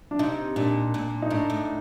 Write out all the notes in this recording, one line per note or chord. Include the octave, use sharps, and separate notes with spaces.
D4
C3 D#4
A#2 D4
A#2
D#4
A2 D4
A2